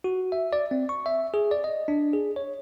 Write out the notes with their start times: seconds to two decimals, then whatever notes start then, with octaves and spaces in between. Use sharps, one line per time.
0.04 F#4
0.32 E5
0.53 D5
0.71 C4
0.89 C#6
1.06 E5
1.34 G#4
1.51 D5
1.64 D#5
1.88 D4
2.13 G#4
2.36 C#5